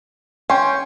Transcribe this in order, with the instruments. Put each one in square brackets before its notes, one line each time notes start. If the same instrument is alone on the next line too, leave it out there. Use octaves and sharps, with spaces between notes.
[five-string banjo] C#4 [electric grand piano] G5 C6